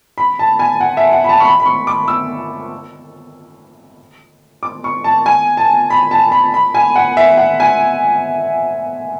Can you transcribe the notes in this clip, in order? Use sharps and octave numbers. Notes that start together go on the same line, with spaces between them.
B5
A5
G#5
F#5
E5
F#5
B5
A5
C#6
B5
B5
C#6
D6
E6
D6
C#6
A5
G#5
A5
B5
A5
B5
B5
G#5
F#5
E5
F#5
G#5